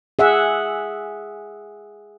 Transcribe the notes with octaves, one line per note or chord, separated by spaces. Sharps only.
G#4 E5 F#5